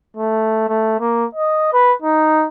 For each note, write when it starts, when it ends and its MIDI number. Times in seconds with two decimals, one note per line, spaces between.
0.17 0.65 57
0.68 0.98 57
1.00 1.25 58
1.35 1.68 75
1.73 1.94 71
2.02 2.47 63